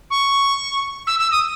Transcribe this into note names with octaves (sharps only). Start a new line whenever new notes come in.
C#6
E6
E6
D#6